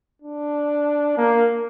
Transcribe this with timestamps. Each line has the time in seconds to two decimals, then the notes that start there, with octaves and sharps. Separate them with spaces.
0.22 D4
1.17 A#3